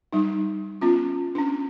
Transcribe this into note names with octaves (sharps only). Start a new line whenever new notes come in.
G3 D#4
B3 C#4 F4
C#4 D4